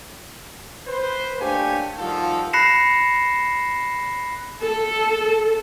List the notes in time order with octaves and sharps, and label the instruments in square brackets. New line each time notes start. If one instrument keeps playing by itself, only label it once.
[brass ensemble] B4 C5
A3 A#3 D4 G4 C#5 G#5
D#3 F3 G3 F4 F#4 A4
[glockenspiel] B5 F#6 A#6 C7 C#7 E7
[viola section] A4